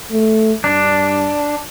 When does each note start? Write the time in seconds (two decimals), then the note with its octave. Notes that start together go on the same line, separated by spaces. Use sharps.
0.12 A3
0.64 G2 D4